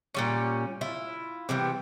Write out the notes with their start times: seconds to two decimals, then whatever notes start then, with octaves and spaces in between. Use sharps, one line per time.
0.15 A#2 G3 C#4
0.81 E4 F4
1.49 C3 E3 G3 B3